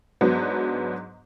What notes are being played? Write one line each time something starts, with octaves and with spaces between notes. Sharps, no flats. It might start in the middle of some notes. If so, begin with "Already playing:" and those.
G#2 F#3 B3 D4